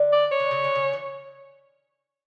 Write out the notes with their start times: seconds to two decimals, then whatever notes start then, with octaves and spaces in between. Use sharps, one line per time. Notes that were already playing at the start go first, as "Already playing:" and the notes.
Already playing: D3
0.13 D5
0.32 C#5
0.40 D3
0.51 C#3
0.64 D3
0.75 C#3
0.93 E3